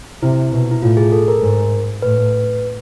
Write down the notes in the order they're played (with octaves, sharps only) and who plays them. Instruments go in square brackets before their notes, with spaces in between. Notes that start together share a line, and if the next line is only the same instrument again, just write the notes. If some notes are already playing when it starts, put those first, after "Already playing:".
[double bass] C3 [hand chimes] E4
[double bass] B2
[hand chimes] E4
[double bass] A2 [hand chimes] F4
[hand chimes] G#4
A4
A#4
[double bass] G#2
[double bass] A2 [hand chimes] B4